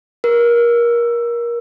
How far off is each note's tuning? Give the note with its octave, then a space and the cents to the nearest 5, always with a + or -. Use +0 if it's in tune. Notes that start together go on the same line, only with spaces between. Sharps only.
A#4 +25